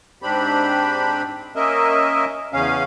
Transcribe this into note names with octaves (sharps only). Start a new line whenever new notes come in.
G#2 C4 D4 G4 B5
A#3 C#4 A#4 D#5 E5
E2 C#3 C#4 F5